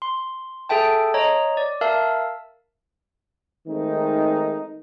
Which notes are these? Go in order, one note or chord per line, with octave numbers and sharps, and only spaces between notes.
C6
G#4 A4 E5 G5 A5
C#5 D#5 A#5
D5
A#4 E5 F5 A5 E6
D#3 G#3 A3 C4 D#4